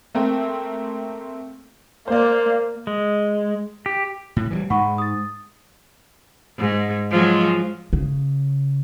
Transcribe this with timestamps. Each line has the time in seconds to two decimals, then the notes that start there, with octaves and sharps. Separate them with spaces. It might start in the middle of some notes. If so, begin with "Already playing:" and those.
0.15 A3 A#3 C4
2.08 A#3 C5 D5
2.87 G#3
3.86 G4
4.36 A2
4.51 E3 F#3 G3
4.70 G#2 G#3 F#5 B5 C#6
4.98 D#6 A6
6.58 G#2
7.11 F3 F#3 G#3
7.93 C#3